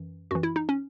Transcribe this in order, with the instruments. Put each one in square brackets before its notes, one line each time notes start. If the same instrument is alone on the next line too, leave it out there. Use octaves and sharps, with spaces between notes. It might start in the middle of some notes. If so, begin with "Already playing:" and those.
Already playing: [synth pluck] F#2 E3
F#2 E3 F#4
E4
D#4
C#4